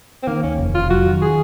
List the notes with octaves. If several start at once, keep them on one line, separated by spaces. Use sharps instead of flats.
C4
D#3 A#3
D#2 C#4
F1
F1 F4
F#3 F#4
D#3
G#4